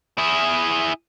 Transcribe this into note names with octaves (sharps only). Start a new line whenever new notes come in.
E4 G#4